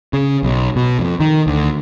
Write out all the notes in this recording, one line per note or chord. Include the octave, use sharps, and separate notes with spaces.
C#3
B1
B2
F2
D#3
D2